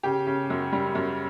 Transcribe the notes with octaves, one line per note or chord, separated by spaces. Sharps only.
C#3 G4
C#3
F#2
G3
F#2